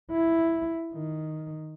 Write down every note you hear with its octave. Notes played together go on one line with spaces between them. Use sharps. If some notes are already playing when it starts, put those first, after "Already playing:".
E4
D#3